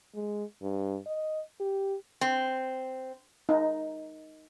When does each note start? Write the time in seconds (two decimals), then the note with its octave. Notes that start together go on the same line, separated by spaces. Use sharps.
0.15 G#3
0.62 G2
1.07 D#5
1.60 G4
2.21 C4
3.49 D#4